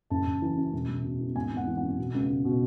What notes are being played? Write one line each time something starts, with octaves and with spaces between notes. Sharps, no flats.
F#1 A5
F#1
E3
F#2
E1
E1
B2
E2
G#1 G#5
G#1
F#5
E3
F#5
F#2
B2
C#2
C#2
B2